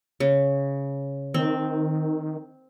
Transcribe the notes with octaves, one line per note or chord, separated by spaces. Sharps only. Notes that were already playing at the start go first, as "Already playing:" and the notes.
C#3
D#3 C4